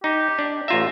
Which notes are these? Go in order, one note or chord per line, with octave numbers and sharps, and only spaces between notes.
D#4 G4
D4
A1 F4 E5 A#5